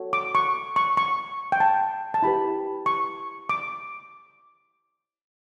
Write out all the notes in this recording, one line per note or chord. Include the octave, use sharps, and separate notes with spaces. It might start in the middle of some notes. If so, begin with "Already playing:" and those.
Already playing: F#4 A4 C#5
D6
C#6
C#6
C#6
G5
A5
A5
E4 G4 B4 B5
C#6
D6